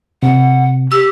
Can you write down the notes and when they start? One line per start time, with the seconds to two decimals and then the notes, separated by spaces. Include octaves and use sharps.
0.23 C3 F#5
0.92 G4 E6